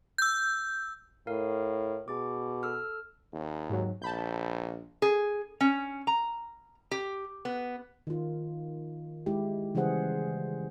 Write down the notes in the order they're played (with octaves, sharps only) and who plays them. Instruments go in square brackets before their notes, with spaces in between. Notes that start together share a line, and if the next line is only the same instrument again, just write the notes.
[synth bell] E6 G6
[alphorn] A2 [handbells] A#4 F5
[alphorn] B2 [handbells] G#4 D6
[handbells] A4 E6 F6
[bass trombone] D#2
[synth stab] G#2 F#3
[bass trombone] A#1 [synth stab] A5 B5 G6
[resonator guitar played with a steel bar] G#4
C#4
A#5
G4
B3
[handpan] D#3 F4
G#3 E4 G4
C#3 E3 G3 G#4 C5 F#5